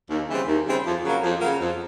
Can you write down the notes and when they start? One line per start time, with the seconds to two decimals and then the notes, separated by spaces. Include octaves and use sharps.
0.10 D#2
0.29 C#3 E3 G3 C4
0.48 D#2
0.66 C#3 E3 G3 C4
0.85 F2
1.04 C#3 F#3 A#3
1.23 F2
1.41 C#3 F#3 A#3
1.60 F2